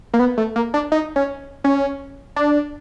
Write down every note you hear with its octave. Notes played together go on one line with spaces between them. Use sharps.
A#3
B3
A3
A#3
D4
D#4
C#4
C#4
D4